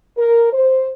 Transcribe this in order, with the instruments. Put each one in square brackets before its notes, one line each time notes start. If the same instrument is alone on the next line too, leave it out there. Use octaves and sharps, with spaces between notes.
[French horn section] A#4
C5